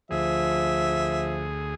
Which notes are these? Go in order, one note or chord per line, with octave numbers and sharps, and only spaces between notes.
D2 F3 G#4 E5